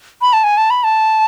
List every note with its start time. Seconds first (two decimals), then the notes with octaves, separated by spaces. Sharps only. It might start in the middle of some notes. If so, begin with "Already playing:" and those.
0.22 B5
0.33 A5
0.44 G#5
0.57 A5
0.70 B5
0.84 A5